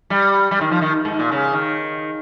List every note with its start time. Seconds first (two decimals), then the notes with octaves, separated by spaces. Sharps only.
0.10 G3
0.51 G3
0.61 D#3
0.71 F3
0.81 D#3
1.05 G#2
1.19 A#2
1.32 C#3
1.53 D#3